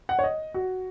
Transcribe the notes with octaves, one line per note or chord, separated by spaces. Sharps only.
F#5
C#5
D#5
F#4